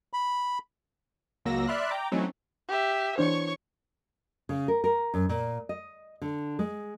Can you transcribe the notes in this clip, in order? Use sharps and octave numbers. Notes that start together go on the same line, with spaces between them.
B5
C#2 F#3 A#3 E6 A#6
D5 E5 B5 C6 F6 F#6
G5 A#5 D6
E3 F#3 A3 C4 C#4 D#4
G4 E5
E3 D4 C5 C#5 C#6
C#3
A#4
A#4
F#2
A#2
D#5
D3
G#3